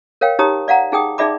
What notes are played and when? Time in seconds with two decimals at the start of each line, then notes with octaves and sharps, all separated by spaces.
0.21 A#4 C#5 F5 G5
0.39 D#4 G4 C#5 A#5 D#6
0.68 D5 F5 F#5 A#5
0.92 D#4 G#4 G5 D#6
1.18 D#4 G#4 D5 E5 B5 D6